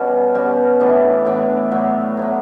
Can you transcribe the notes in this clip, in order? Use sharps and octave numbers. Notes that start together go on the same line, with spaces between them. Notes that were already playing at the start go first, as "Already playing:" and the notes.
Already playing: B2 G3 C#4 F#4
B2 G3 C#4 F#4
A2 E3 B3 D4
A2 E3 B3 D4
A2 F#3 B3
A2 F#3 B3